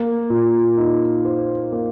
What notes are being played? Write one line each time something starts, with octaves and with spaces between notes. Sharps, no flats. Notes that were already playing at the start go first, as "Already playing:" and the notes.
Already playing: A#3
A#2
D#4
C5
A#3